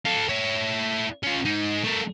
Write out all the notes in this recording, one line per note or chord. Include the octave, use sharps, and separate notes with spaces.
A4 F5
E4 C#5
C#4 F4
G#2 D#4
A3 A#4